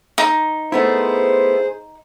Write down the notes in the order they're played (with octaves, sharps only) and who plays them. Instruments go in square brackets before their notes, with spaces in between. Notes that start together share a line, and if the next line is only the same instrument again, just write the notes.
[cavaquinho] D#4
[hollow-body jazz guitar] A3 B3 E4 [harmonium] G#4 C5